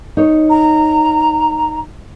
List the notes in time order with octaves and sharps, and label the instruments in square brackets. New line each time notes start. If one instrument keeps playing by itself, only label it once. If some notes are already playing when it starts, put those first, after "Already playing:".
[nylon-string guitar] D#4 C#5
[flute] A#5